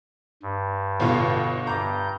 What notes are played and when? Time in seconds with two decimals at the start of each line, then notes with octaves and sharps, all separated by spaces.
0.42 G2
1.00 G1 B2 F4
1.67 G2 A#5 D6 G6